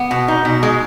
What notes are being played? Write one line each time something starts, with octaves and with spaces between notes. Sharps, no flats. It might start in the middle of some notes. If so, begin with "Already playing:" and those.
Already playing: B3
B2
D#4
B2
G#3